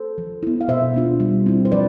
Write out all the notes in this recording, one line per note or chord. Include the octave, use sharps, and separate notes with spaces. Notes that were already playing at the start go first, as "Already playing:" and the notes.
Already playing: A4 C5
F3
B3 E4
F5
B2 C5 E5
B3 D4 F4
G3
C4 E4
C5
F3 B4 D5